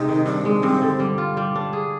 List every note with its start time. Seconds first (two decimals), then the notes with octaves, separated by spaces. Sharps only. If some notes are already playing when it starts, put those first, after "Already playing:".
Already playing: C3 G#3 D#4
0.08 D#3
0.26 G2 D4
0.45 G#3
0.63 G2 C4
0.81 D3
0.99 G3
1.18 F4
1.37 G3
1.55 D4
1.73 G#4